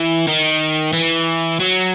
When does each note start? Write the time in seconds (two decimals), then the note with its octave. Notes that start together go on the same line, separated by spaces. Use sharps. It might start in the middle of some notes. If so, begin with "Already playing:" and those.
Already playing: E3
0.27 D#3
0.93 E3
1.60 F#3